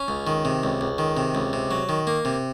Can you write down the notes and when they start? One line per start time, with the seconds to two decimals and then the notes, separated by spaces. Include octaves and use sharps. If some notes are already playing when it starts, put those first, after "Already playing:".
Already playing: C#4
0.08 C#2
0.27 D#3
0.45 C3
0.64 C#2
0.81 C#2
0.98 D#3
1.17 C3
1.35 C#2
1.53 C3
1.71 F#3
1.89 D#3
2.07 A#3
2.25 C3